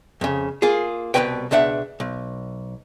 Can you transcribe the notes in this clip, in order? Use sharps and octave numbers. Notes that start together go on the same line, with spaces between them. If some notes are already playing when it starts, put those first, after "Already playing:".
F2 C#3
A#3 F4 G#4
C2 B2 E3 C4 B4 G5
C#2 B2 D4 E5 F#5
B1